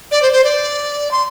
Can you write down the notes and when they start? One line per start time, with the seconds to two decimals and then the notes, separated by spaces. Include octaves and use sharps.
0.11 D5
0.22 C5
0.32 C5
0.44 D5
1.11 C6